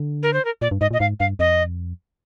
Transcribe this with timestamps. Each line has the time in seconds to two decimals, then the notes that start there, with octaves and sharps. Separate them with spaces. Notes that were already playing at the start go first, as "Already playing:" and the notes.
Already playing: D3
0.23 A#4
0.33 C5
0.45 A#4
0.61 A#2 D5
0.71 G2
0.81 G#2 D#5
0.91 A#2
0.93 D#5
1.00 G#2 F5
1.20 G2 F5
1.39 F2 D#5